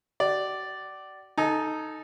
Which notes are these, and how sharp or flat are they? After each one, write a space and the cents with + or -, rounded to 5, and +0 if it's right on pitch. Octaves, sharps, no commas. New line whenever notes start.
F#4 +45 D5 +0
D#4 +0 A4 +0 G#5 +30